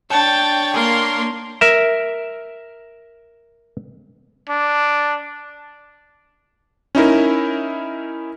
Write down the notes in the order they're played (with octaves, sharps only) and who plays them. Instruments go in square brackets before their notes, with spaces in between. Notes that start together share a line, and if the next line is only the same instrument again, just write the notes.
[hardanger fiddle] D4 C#5 [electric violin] G5 A6 [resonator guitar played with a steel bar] A5
[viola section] A#3 C6 [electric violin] A#4 [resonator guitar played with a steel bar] G#5
[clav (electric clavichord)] A#4 E5
[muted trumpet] D4
[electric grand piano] C#4 D#4 E4 A#4